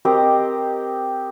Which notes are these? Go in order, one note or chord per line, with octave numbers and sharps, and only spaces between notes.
C4 G4 A#4 D#5